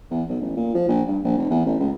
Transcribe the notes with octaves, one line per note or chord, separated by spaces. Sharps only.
E2
B1
A1
A#2
F3
A#1
G2
A#1
F1
E2
A1
C#2